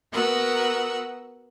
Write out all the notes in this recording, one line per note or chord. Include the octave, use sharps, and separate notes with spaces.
B3 F#4 A#4 F#5 E6